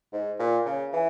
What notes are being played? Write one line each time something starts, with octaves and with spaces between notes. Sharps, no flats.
G#2
A#2
C#3
E3